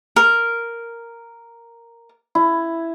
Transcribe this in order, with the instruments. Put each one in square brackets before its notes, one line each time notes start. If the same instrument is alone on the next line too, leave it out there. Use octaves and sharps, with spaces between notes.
[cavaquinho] A#4
[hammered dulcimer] E4